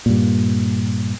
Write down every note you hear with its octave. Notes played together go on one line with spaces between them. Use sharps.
G2 A#2